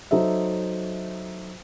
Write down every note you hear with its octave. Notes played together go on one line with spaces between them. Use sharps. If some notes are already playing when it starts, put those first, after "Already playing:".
F#3 D#4 A4 C5 E5